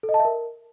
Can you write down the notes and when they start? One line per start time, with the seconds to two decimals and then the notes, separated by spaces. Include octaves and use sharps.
0.03 A4
0.09 D#5
0.14 A5
0.20 E5
0.25 A#4